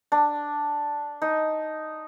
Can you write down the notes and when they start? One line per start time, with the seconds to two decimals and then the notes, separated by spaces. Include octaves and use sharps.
0.12 D4
1.22 D#4